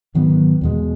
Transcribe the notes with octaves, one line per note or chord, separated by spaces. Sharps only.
G#2 D#3 F#3 B3
E2 B2 G#3